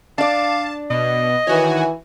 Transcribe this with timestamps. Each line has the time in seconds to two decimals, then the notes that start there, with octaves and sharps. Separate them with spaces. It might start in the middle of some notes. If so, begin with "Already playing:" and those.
0.18 D4 D5 F5 A5
0.90 B2 D#5
1.47 D#3 E3 F#4 C#5 G#5